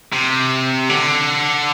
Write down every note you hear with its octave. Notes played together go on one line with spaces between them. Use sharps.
C3
D3